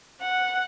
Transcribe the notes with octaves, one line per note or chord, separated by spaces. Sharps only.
F#5